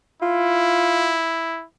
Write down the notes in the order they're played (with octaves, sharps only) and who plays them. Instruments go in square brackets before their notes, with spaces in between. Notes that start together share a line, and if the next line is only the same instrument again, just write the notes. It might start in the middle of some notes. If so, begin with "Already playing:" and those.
[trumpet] E4 [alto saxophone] F4